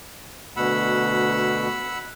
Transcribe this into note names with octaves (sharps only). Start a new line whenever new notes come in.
D2 B2 F#5 B5 E6